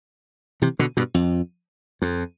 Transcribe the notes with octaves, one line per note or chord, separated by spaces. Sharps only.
C3 E3
B2 D3
G2 B2
F2
F2